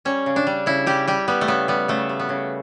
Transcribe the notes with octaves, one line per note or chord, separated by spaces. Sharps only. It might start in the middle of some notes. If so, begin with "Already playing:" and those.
G3 C#4
C#3
D4
G3
C#3 E4
G3 G4
G3 G4
G3 B3
A3
C#3 B3
G3 B3
C#3 A3
G3
B3
C#3